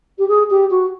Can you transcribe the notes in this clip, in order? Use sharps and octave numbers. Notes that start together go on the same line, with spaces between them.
G4
G#4
G4
F#4